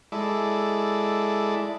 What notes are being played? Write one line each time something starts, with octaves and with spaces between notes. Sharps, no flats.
G#3 E4 A4 D5